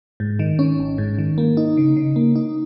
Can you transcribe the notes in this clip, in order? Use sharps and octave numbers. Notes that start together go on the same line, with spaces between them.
G#2
D#3
C#4
G#1
G#2
D#3
A#3
D#4
C#3
C#3
A#3
D#4